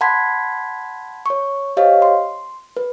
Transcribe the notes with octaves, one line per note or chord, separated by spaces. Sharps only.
F#5 A5 B5 C6 G#6 B6
C#5 C#6
G4 C5 C#5 D#5 F5
C6
B4